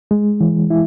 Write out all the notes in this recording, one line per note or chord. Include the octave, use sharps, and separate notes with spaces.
G#3
E3
E4